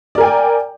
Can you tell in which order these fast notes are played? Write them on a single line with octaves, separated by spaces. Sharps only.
D5 A#4 G#5 G5